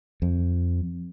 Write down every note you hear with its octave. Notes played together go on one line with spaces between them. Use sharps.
F2